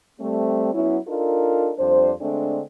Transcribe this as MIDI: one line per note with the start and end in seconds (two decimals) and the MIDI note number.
0.20 0.73 55
0.20 0.73 57
0.20 0.73 60
0.74 0.98 54
0.74 0.98 59
0.74 0.98 61
0.74 0.98 64
1.08 1.72 62
1.08 1.72 63
1.08 1.72 65
1.08 1.72 69
1.08 1.72 70
1.79 2.14 41
1.79 2.14 55
1.79 2.14 62
1.79 2.14 72
2.21 2.61 50
2.21 2.61 56
2.21 2.61 57
2.21 2.61 60
2.21 2.61 62